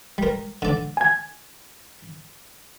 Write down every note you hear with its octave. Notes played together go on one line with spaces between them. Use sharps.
G3 A#4
D3 D5
G#5 G#6